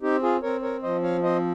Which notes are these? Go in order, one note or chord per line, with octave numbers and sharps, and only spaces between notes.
C4 D#4 G4
F4 G#4
C4 A#4 C#5
A#4 C#5
F3 C5 D#5
C#5 F5
C4 C5 D#5